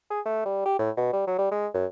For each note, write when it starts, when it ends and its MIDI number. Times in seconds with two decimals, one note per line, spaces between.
0.10 0.20 68
0.26 0.41 57
0.45 0.63 55
0.65 0.76 67
0.79 0.90 45
0.97 1.12 47
1.13 1.26 55
1.27 1.36 54
1.38 1.51 55
1.51 1.67 56
1.74 1.86 42